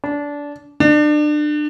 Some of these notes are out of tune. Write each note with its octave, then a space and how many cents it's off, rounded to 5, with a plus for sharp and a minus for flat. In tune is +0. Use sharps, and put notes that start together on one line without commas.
D4 -20
D4 +30